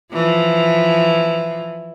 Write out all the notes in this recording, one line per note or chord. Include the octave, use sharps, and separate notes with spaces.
E3 F3